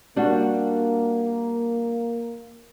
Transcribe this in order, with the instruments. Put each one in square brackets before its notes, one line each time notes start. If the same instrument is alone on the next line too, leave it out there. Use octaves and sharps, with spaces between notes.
[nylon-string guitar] G3 D4 F#4 [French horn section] A#3